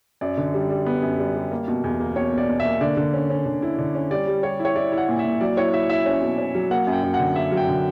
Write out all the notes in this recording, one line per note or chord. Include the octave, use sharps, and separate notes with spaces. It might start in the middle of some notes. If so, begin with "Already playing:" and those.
F#2 D5
D3
G3
G3
B3
F#2
G3
G3
A#3
B2
E2
A#3
B2 C#5
B2
D5
B2
E5
A#3
D3 D5
D3
C#4
C#4
D3
E4
D3
C#4
G3 D5
G3
G3 C#5
E4
C#5
E4 D5
E4
F#5
A#2
E5
A#2
F#3 D5
E4 C#5
E4 E5
E4 E5
C#4
B2
C#4
F#3
A#3 F#5
F#2
G5
F#2
F#5
D3
A#3 E5
F#3
G5
D3